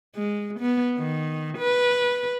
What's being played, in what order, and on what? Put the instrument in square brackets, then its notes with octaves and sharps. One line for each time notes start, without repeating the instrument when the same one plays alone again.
[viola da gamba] G#3
B3
D#3
B4